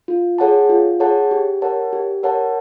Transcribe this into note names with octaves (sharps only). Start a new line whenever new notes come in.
F4
G#4 C#5 F#5 A5
F4
G#4 C#5 F#5 A5
G4
A#4 C#5 F#5 A5
G4
A#4 C#5 F#5 A5